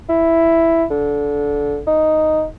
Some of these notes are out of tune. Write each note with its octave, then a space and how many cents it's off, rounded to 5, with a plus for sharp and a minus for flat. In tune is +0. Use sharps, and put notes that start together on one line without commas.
E4 +5
D3 -20
D#4 +0